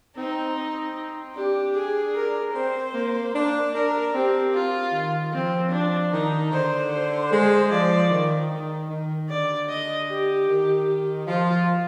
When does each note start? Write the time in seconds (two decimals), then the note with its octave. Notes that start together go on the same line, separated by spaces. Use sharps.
0.17 C4 D#4
0.57 C4
1.35 D4 G4
1.75 G#4
2.15 A#4
2.55 C4 C5
2.94 A#3
3.34 D4
3.74 D4 A#4
4.14 C4 G4
4.54 F4
4.93 D#3
5.32 F3 C4
5.72 D4
6.12 D#3 D#4
6.52 D3 C5
6.91 C5
7.30 G#3 C5
7.70 F3 D5
8.10 D#3
8.50 D#3
8.90 D#3
9.29 D3 D5
9.69 D#5
10.09 G4
10.48 D#3
11.27 F3 F4